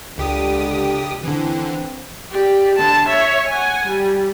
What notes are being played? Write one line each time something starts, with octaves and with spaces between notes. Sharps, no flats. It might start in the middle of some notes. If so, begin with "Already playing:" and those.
C#2 D3 G4 D#6
D3 E3 C4
G4 D5
D3 A5
C#5 E5
F#5 G#5
G3